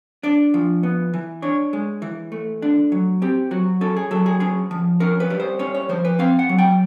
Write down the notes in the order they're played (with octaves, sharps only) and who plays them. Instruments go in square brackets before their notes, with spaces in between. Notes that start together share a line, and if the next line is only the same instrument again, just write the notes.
[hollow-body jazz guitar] D4 D5
F3
B3
E3
D4 C#5
G#3
E3
A3
D4
F#3
C4 G4
F#3 F#4
C#4 A4
G#4
F#3 A4
G#4
C#4 G#4
F3
C#4 A#4
B4
G3
C5
C#4 C#5
C#5
F3 C5
B4
C4 F5
F#5
F#3
G5